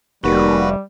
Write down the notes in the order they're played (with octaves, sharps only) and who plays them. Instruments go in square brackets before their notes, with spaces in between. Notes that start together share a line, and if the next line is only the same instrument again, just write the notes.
[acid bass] F1 [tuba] D#2 [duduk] G3 [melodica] F#4 B4